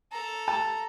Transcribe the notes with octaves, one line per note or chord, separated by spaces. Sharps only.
A4 A#5
A5